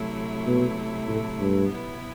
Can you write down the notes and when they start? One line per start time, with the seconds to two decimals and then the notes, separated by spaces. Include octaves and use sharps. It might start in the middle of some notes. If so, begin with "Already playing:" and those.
Already playing: C3 F#3 A3 E4
0.47 B2
1.08 A2
1.39 G2
1.69 B2 F#3 B3 E4 B4